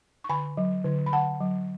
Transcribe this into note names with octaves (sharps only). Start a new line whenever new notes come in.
C#6
D3 G#5 B5
F#3
D3
B5
D3 F#5 A5
F#3